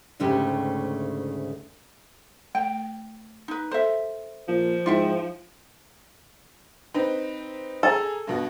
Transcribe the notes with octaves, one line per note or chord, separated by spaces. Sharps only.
D2 G#2 C#3 A3 G4
A3 G5
D#4 B4
A4 C5 E5
A#2 F3
G#2 E4 F4 E5 G5
C4 D#4 B4
G#4 A4 G#5 A#5
G2 B2 F#4